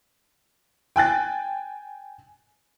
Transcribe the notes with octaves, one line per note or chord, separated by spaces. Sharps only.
G5 G#5 F#6 A6